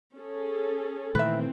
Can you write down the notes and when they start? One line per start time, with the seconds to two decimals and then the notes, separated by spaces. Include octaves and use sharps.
0.16 C#4 G#4 A4
1.15 A#2 D#3 E3 A3 C4 B4 E5